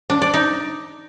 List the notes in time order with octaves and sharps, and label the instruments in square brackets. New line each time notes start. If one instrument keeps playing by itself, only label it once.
[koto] D4
D5
D#4